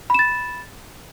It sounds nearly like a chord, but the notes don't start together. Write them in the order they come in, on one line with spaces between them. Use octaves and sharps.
B5 E7 A6